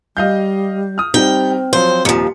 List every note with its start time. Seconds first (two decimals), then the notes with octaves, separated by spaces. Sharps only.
0.17 G3 D#5 F5 G6
0.98 D#6 F6
1.14 G3 C4 D#4 G5
1.73 F3 F#3 C5
2.05 D#1 D#2 F3 C#7